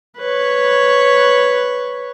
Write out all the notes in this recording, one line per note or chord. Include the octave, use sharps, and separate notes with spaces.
B4 C#5